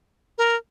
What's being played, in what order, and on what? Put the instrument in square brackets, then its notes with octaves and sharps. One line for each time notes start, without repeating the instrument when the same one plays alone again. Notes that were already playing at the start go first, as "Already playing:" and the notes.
[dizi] A#4